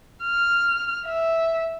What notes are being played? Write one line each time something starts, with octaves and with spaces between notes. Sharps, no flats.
F6
E5